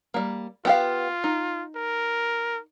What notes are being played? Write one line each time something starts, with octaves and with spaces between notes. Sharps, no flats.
G3 A#3
B3 F4 G4 F5
D#4
A#4